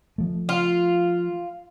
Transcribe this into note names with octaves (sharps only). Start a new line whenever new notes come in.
F3 A3
F4